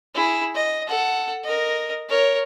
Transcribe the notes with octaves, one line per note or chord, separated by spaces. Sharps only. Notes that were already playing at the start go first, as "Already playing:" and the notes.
E4 G#4
D#5
A4 F#5
A#4 D#5
A#4 C#5